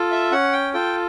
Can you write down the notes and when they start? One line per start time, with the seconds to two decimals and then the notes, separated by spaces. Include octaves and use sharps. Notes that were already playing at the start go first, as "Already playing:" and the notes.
Already playing: F4 A4
0.11 E5
0.31 C#4 F#5
0.53 G5
0.74 F4 A4 G5